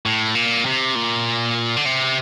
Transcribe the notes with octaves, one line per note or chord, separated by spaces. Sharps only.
A2
A#2
C3
A#2
D3
C3